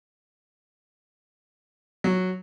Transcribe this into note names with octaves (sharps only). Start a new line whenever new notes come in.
F#3